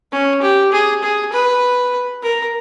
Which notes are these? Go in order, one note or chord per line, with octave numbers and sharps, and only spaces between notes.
C#4
G4
G#4
G#4
B4
A#4